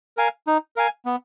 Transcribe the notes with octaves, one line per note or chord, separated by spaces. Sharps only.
A#4 F5 G#5
D#4
A#4 F5 G#5
B3